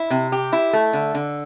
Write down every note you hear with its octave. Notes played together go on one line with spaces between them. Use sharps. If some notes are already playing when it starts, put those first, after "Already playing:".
Already playing: E4
C3
G4
E4
A3
D3
D3